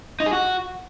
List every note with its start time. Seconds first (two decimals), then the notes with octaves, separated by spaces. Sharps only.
0.20 D#4
0.26 G#4
0.33 F#4